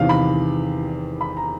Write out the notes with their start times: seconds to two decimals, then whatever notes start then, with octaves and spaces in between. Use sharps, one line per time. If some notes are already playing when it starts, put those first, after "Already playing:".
Already playing: E2 C3 D#3 F5
0.09 B5
1.21 B5
1.37 A#5